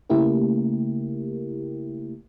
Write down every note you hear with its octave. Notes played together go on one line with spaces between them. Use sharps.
C#3 A3 A#3 E4 G4 A#4